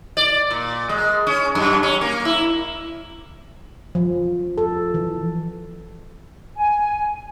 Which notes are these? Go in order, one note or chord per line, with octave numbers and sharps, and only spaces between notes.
D5
A#2
G#3
C#4
F#2
C#4
A#3
E4
F3
A4
E3
G#5